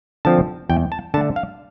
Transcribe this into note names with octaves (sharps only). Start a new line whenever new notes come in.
D3 F3 C4 A5
E2 G5
A5
D3 A3 A5
F5